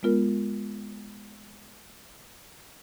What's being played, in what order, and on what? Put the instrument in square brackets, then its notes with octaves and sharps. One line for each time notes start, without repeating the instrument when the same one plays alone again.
[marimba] G#3 B3 F4 A#4